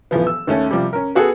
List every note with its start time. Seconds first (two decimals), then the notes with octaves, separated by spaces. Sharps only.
0.11 D#1 E3 F3 B3
0.27 E6
0.47 D#2 A3 C#4
0.71 C3 F3 G3
0.93 C#4 A#4
1.15 B3 F#4 G#4 A4